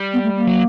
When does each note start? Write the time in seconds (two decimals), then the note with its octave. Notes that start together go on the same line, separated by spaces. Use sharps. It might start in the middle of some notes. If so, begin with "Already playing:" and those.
Already playing: G3
0.13 B3
0.24 A3
0.36 A#3
0.47 F#3